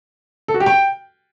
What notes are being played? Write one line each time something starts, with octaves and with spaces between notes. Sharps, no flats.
A4
F#4
G4
G5